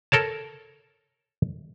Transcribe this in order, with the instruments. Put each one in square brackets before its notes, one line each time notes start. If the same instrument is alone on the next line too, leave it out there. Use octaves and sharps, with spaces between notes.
[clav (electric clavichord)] A4 A#4 C#5 A5